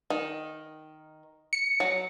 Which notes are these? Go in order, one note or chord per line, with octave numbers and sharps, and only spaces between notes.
D#3
C#7
F#3